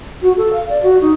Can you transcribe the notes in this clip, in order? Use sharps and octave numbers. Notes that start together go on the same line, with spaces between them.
F#4
A4
F5
D5
F#4
D#4